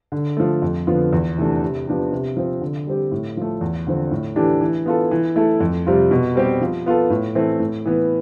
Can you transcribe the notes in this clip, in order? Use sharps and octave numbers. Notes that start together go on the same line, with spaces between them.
D3
F3 A3
F2
D3 F3 B3 F4
E2
C3 E3 A3 D4
C3
F3 B3 D4 G4
C3
F3 C4
D3
G3 C4 G4
A2
F3 A3
E2
D3 F3 C4
A2
E3 A3 D4 G4
E3
B3 F4 A4
E3
A3 E4 A4
F2
C3 G3 C4 F4
B2
G3 C4 G4
F3
B3 F4 A4
A2
E3 A3 C4
A2
E3 B3